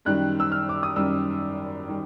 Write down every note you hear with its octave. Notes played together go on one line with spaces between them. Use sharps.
F#2 D#3 G3 F#6
E6
F6
D6
D#6
F#2 D#3 G3 E6
D#3 G3